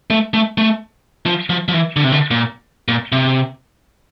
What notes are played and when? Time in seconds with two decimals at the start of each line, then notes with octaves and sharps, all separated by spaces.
0.10 A3
0.34 A3
0.58 A3
1.26 F3
1.50 F3
1.68 F3
1.73 E3
1.96 D3
2.04 C3
2.12 D3
2.31 A#2
2.88 A#2
3.12 C3